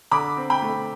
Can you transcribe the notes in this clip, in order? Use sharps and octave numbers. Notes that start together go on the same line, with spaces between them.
D3 B5 D6
C4
G5 B5
A3